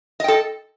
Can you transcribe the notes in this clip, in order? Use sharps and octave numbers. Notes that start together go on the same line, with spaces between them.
A4 D#5 G5